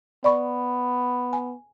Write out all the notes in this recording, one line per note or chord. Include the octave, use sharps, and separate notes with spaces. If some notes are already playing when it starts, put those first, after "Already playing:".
B3 D5 B5 C#6
G#5